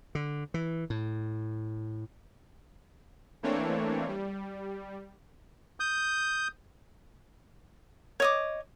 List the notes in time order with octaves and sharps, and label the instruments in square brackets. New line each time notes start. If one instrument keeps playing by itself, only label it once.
[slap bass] D3
E3
A2
[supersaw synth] E3 A3 A#3 C4 D4 C#5
G3
[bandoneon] D#6 G6
[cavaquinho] C#5 D#5 D6